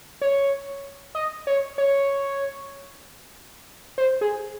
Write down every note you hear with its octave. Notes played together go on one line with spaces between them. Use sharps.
C#5
D#5
C#5
C#5
C5
G#4